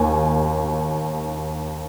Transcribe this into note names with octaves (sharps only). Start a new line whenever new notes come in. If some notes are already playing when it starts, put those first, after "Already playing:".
Already playing: D#2 G#5